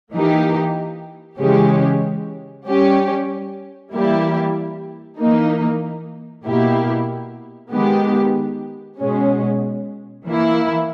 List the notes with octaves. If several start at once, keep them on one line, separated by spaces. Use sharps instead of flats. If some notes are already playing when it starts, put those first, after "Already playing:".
E3 A#3 D#4 G4
C#3 E3 G#3 C#4 G4
G3 C#4 G4
E3 G3 A#3 E4 G4
E3 A#3 D#4
B2 A#3 E4 G4
D#3 G#3 B3 G4
B2 G#3 C#4
E3 A#3 E4